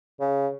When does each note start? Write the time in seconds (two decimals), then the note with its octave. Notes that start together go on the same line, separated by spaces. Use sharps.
0.21 C#3